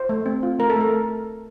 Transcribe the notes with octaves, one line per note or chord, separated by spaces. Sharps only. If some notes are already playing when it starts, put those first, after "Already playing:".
Already playing: C5
A3
C4
F4
A3 A#4
A4
A3 A#4